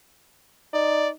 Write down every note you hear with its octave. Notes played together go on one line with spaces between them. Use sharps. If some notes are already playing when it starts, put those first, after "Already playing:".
D#4 D5